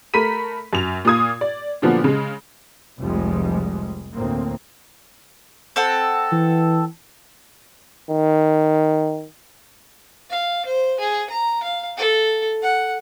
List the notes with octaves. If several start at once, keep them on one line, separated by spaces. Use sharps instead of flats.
A3 A#4 B5 B6 D#7
F#2 F7
A#2 F4 D#6 G#6
D5
A#2 D3 F3 F#3 B3
C#3 G#3
F1 C2 F3 G3 G#3
D2 A2 A#3 C4
C4 A4 F#5
E3
D#3
F5
C5
G#4
A#5
F5
A4
F#5